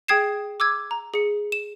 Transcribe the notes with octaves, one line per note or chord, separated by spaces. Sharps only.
G#4 G5 D#6 G#6 C7 E7
D6 E6 G#6
A#5
G#4 C#7
E7